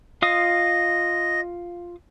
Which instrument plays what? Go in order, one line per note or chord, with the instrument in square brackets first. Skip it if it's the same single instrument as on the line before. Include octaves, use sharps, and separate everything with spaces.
[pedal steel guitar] F4 F5 D#6 [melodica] D#5